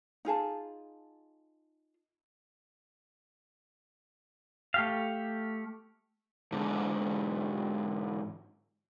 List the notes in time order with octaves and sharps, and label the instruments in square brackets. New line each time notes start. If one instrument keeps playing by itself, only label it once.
[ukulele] D#4 F4 G#4 A5
[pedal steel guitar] A3 G4 F5
[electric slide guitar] G#2 D3